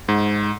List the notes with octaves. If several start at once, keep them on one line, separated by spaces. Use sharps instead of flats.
G#2